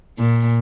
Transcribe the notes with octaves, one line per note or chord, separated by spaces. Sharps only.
A#2